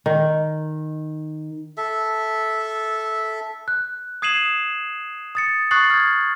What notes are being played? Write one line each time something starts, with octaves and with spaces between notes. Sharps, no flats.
D#3
A4 E5
F#6
D#6 G#6 C7 D#7 E7 F#7
D#6 A6 C#7
C#6 D#6 F#6 A6 C7 F#7
F6 G#6